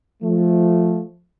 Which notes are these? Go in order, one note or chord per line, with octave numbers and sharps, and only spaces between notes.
F3 A3